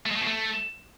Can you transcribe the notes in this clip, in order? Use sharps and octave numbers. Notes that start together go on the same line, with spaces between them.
A3
G#3
A3
B2
A3